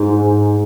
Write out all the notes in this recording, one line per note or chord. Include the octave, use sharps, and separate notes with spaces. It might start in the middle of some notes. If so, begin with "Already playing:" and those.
Already playing: G#2